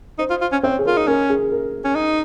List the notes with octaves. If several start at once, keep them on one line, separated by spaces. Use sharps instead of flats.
D#4 C5
F4
F4
C#4
C4 C#5
G#4
F4 A#4
D#4
C#4 A#4
G#4
A#4
C#4
D#4